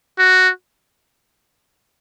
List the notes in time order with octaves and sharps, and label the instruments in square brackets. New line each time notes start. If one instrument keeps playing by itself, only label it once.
[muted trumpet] F#4